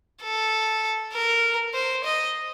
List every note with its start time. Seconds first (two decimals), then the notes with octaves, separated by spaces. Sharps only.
0.23 A4
1.13 A#4
1.74 C5
2.05 D#5